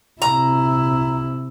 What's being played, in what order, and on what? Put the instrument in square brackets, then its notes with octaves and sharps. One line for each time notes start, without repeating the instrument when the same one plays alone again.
[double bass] C3 E4 [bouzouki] A#5